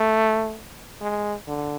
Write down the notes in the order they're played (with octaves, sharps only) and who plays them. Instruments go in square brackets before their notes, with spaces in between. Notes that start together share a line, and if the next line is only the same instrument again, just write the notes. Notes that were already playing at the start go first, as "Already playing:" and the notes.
Already playing: [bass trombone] A3
G#3
D3